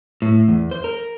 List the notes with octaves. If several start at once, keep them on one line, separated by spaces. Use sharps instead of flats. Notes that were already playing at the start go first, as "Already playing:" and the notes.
A2
E2
C5
A#4